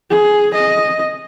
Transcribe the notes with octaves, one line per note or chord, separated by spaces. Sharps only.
G#4
D#5